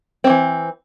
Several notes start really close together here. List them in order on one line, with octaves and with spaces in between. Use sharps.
C4 D#3 E3